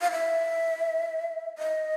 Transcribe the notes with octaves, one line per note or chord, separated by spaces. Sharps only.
F5
E5
D#5